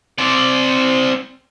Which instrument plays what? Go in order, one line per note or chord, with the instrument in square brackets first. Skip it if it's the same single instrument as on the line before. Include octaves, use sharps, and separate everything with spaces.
[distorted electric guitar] C4 D5